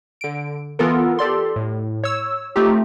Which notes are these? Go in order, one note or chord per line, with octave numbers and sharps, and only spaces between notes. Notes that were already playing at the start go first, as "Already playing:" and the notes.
D3 D7
E3 B3 F4 A4 A#4
G4 A4 D5 C6
A2
C#5 E6
A3 C4 D#4 F4 G4